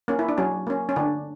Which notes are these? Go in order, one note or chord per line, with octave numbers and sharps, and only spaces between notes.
A#3 C#4
E4
D4
F#3 C#4
A#3 C#4
C#4
D3 D4